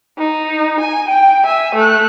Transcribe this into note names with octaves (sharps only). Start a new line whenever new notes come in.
D#4
G#5
G5
E5 G#5
A3 F#6